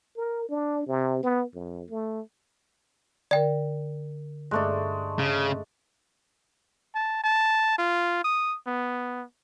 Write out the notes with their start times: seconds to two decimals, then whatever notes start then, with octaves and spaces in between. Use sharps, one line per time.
0.17 A#4
0.49 D4
0.87 C3
1.23 B3
1.54 F2
1.90 A3
3.31 D3 A#4 D5 G5
4.51 G2 G#3 A3 D4 F#6
5.19 C#3
6.95 A5
7.24 A5
7.79 F4
8.25 D#6
8.67 B3